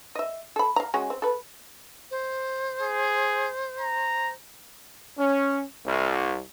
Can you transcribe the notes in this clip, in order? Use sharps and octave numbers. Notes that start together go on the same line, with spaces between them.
D#5 E5
A4 B5
F5 A#5
G#3 C#4 F#4
C4
A4 B4
C5
G#4
A#5
C#4
C2